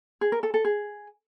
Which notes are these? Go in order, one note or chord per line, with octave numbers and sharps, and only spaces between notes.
G#4
A#4
A4
A4
G#4